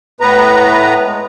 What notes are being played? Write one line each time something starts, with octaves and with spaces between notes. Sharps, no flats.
A2 B3 B4 A#5
G#3